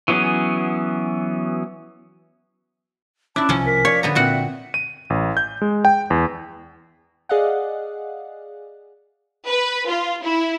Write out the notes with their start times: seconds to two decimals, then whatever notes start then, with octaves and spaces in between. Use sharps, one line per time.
0.08 E3 F#3 B3 C#4 G#4
3.36 C#4 D4 E4 A5 D6 F#6
3.49 C2 C3 F3 C#4 G#5
3.66 A#4 B6
3.85 C#5 D5 F5
4.03 D3 B3 F#5 A#5
4.15 A#2 C4 F#4 E5 F#5
4.74 D#7
5.10 A1
5.37 G6
5.62 G#3
5.85 G5
6.10 E2
7.29 G#4 D5 D#5 F5 F#5
9.48 B4
9.89 F4
10.23 E4